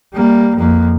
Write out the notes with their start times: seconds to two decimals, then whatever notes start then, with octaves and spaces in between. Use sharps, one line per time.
0.13 G3 A#3
0.57 F2 A#3